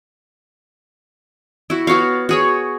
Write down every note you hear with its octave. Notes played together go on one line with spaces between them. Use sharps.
E4 F#4
B3 F#4 C#5 F5
F#4 G#4 C#5